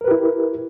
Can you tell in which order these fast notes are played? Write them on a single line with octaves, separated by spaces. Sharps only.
A#4 B4 G4 E4